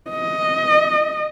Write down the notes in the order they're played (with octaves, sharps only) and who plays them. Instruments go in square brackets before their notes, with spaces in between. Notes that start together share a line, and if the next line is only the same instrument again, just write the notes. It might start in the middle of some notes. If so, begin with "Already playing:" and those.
[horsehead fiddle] D#5